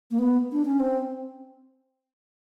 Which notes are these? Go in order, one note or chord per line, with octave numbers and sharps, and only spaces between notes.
A#3
B3
D4
C#4
C4